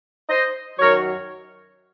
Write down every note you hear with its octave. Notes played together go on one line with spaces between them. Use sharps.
C5 D#5
F#2 D#3 F#3 A#4 C#5